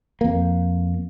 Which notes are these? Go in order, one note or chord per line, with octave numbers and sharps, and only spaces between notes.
F2 A#3